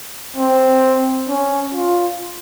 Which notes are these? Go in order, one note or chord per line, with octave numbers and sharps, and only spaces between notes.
C4
C#4
F4